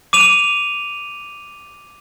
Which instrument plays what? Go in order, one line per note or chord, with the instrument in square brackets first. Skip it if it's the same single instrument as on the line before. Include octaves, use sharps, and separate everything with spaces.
[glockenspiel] D6 D#7 F7